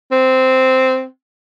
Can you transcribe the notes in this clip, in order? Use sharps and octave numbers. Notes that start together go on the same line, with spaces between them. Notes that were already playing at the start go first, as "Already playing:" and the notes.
C4